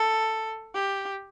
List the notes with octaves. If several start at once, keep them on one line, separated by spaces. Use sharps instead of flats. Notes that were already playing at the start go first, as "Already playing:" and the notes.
Already playing: A4
G4